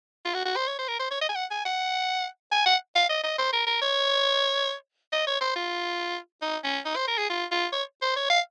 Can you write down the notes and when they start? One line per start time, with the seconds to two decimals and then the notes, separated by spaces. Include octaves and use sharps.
0.25 F4
0.34 F#4
0.45 F#4
0.56 C5
0.67 C#5
0.78 C5
0.88 A#4
0.99 C5
1.11 C#5
1.21 D#5
1.29 G#5
1.35 F#5
1.50 G#5
1.65 F#5
2.52 G#5
2.66 F#5
2.95 F5
3.09 D#5
3.23 D#5
3.38 C5
3.53 A#4
3.67 A#4
3.82 C#5
5.12 D#5
5.27 C#5
5.41 C5
5.56 F4
6.42 D#4
6.64 C#4
6.85 D#4
6.96 C5
7.07 A#4
7.18 G#4
7.29 F4
7.51 F4
7.72 C#5
8.02 C5
8.16 C#5
8.30 F5